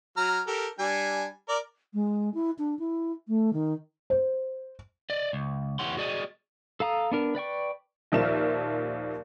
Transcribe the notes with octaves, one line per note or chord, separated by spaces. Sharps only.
F#3 A#5 F6
G4 A4 A#4
G3 D4 G#5
A#4 D5
G#3
E4
D4
E4
A3
D#3
C5
D5 D#5
C#2
E2 E4 G4 C#5 F#5 C6
F#4 G#4 D5 D#5
A4 F5 A#5 D#6
B3 D4 A#4
B4 D5 G5 C#6
D#2 A#2 F3 A#4 E5 E7